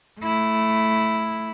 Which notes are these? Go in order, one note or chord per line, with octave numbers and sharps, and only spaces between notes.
A3 E4